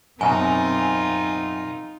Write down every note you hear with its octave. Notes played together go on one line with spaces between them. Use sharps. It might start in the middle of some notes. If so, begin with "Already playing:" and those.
F#2 B2 C4 D#4 F4 G#5